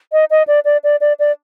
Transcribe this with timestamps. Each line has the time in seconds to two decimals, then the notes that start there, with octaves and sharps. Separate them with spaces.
0.12 D#5
0.30 D#5
0.47 D5
0.65 D5
0.84 D5
1.01 D5
1.19 D5